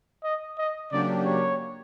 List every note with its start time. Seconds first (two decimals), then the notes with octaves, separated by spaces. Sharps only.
0.24 D#5
0.58 D#5
0.91 C#3 F#3 A#3 D4 G4 D5
1.25 C#5